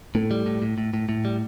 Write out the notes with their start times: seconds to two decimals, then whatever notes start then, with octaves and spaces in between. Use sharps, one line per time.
0.15 A2 A3
0.31 G3
0.46 A2
0.62 A2
0.78 A2
0.94 A2
1.09 A2
1.25 G3